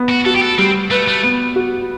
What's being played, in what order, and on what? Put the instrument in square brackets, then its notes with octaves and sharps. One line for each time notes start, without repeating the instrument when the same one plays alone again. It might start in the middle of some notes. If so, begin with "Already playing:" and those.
Already playing: [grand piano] B3
[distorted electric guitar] F#4
[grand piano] F#4 [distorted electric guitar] A4
[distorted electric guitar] G4
A4
[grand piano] G3 [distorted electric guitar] C4
[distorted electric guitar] A3 [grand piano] B4
[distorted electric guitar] A3
[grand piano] B3
F#4